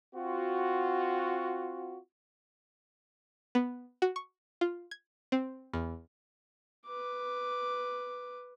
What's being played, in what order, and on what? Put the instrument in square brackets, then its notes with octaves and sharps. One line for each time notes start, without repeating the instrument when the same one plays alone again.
[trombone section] C4 F4 F#4
[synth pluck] B3
F#4
C#6
F4
G#6
C4
E2
[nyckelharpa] B4 D6